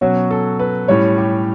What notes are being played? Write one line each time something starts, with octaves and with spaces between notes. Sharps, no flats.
B2 F#3 C#4 F#4
A4
B4
A2 G3 C#4 C#5
G4